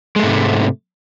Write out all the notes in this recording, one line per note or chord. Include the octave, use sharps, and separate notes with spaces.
G#2 C3 G#3 A3